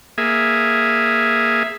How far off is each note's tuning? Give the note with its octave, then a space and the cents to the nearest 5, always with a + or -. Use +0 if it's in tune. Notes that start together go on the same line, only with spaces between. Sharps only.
A#3 +0 G#4 +0 E5 -5